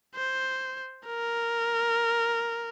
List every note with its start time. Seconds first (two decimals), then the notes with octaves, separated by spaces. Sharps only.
0.15 C5
1.07 A#4